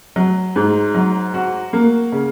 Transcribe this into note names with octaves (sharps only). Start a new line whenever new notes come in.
F#3
G#2
F#3
F#4
A#3
C#3